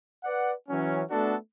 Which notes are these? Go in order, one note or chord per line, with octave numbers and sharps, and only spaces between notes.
B4 D5 F#5
E3 F#3 C#4
A3 B3 D4 F#4 A4